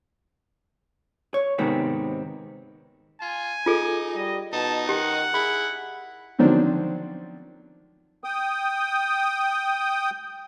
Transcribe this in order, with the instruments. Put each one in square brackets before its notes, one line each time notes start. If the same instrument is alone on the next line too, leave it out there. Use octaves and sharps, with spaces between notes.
[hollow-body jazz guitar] C#5
G#2 C3 D#3 G#3 B3 C4
[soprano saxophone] F4 [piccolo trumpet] G#5
[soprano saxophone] D#4 [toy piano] F4 G#4 A4
[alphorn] G3 [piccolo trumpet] D#5
[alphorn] B2 [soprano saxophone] D#4 [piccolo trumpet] A5
[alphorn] D#3 [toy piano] G4 [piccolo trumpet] F#5
[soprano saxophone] E4 [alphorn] G#4 [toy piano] B5
[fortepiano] D3 D#3 F3 F#3 C4 D4
[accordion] G5 D#6